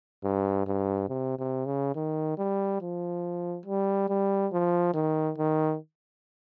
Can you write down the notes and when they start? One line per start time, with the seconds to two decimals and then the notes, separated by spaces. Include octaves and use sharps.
0.24 G2
0.67 G2
1.09 C3
1.39 C3
1.66 C#3
1.96 D#3
2.38 G3
2.81 F3
3.66 G3
4.09 G3
4.52 F3
4.94 D#3
5.38 D#3